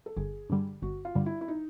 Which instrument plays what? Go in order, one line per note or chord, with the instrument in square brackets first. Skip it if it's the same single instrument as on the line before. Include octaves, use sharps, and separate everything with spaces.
[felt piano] A4
[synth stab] G1 [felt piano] G#4
[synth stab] G2 D3 G3
[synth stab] G1 [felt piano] F#4
[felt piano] F4
[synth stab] G2 D3 G3
[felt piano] E4
E4
D#4